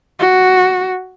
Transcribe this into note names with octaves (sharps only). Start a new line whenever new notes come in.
F#4